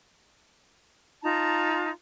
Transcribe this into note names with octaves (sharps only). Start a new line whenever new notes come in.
D#4 F4 A5 A#5